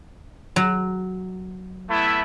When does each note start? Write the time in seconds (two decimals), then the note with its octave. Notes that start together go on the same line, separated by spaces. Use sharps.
0.56 F#3
1.89 A3 B3 E4